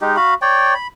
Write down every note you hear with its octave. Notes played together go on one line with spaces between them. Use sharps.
G#3 D#4 G4
F#4 F5 B5
C#5 D5 G5
B5